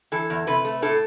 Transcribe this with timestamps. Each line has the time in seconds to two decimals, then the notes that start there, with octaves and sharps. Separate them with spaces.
0.12 E3 A4
0.30 E2
0.47 C3 B4
0.65 A3
0.82 A2 A4